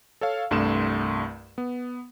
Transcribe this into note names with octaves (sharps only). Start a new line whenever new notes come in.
A4 C#5 F5
C2 G2 A3 C6 E7
B3